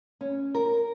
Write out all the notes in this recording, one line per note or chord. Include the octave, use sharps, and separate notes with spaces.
C#4
A#4